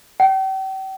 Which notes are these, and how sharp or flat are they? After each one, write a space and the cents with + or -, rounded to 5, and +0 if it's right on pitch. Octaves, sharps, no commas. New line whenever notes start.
G5 -40